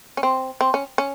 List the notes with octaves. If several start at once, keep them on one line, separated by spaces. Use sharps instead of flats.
C#4
C4
C4
C#4
C#4